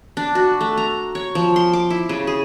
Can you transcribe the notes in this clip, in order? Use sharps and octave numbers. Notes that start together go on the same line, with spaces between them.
D4
F#4
A3
A#5
C#5
F3
C6
D6
E4
C#3
G#4